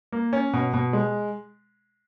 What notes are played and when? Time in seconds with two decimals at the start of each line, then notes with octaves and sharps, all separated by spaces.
0.12 A#3
0.33 C#4
0.53 B2
0.74 B2
0.93 G#3